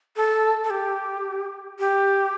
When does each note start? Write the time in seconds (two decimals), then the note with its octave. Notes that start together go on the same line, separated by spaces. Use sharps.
0.16 A4
0.64 A4
0.70 G4
1.79 G4